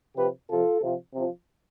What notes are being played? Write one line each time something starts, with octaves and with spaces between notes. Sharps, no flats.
C3 F3 G4 B4
C3 F3 F4 A4
C3 F3
C3 F3